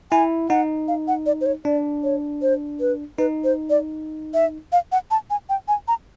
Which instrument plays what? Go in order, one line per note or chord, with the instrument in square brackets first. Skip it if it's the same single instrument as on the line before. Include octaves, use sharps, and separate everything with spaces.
[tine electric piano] E4 [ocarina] G#5
[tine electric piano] D#4 [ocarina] F#5
[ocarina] F5
F#5
D5
C5
C#5
[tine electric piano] D4 [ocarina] D5
[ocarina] C#5
C5
B4
[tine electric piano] D#4 [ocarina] B4
[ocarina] C5
D5
E5
F5
F#5
A5
G#5
G5
G#5
A#5